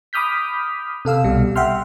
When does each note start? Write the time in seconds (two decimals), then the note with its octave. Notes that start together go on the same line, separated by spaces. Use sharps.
0.13 B5 D6 D#6 F6 G6 B6
1.05 C3 A4 F5 E6
1.24 C2 B2 G3
1.56 E5 F#5 G5 C6 F6